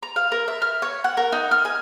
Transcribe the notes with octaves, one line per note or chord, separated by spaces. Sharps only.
A#5
F5
A#4
E5
F6
C#5
F#5
A#4
D#4
F6
G#5